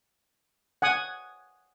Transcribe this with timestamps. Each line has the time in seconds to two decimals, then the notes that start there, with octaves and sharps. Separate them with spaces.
0.82 F#5 G#5 D#6